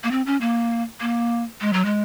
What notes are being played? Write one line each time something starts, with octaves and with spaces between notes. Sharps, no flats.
A#3
C4
C#4
A#3
A#3
G#3
F#3
G#3